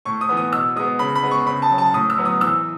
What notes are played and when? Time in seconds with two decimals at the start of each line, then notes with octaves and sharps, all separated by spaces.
0.05 A2 C#6
0.21 D#6
0.29 E3 B3
0.37 D#6
0.52 B2 E6
0.76 G#3 B3 D#6
0.99 C#3 B5
1.15 B5
1.23 G#3 B3
1.31 C#6
1.47 C#3 B5
1.62 A5
1.71 F#3 C#4
1.78 A5
1.94 A2 D#6
2.10 E6
2.18 F#3 B3
2.25 D#6
2.41 E3 E6